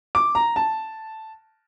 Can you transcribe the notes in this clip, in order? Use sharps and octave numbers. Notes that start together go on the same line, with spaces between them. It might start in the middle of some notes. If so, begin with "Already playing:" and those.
D6
A#5
A5